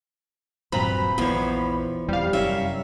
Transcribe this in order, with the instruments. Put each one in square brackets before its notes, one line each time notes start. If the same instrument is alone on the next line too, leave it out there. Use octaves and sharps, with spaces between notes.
[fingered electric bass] D#1 G2 F#3 [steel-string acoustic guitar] A#2 [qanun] C4 B4 A#5 [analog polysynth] B5
[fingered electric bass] A#1 [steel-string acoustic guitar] E2 F3 [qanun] B3 C#5
[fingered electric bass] E1 F2 E3 [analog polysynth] G3 F5
[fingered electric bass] F1 F#2 [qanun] C#4 A#4 C#5 [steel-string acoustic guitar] E5